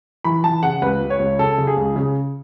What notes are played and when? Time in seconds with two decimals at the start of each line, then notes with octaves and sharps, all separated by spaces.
0.24 E3 B5
0.44 E3 A5
0.63 C#3 F#5
0.82 C#2 B4
1.01 C#2
1.10 C#5
1.20 C#2
1.39 C#3 A4
1.58 C#3
1.67 G#4
1.77 C#2
1.96 C#3